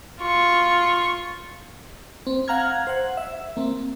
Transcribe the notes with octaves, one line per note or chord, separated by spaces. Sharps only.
F4 C#6
C4
F5 F#5 A#5 F6 G#6
C5 F#5
E5
A#3 C4